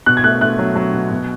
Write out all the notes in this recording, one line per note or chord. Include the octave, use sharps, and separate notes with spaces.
B2 F#6
G#6
A3 F#6
A3 F#6
F#3
F#3
B2
B2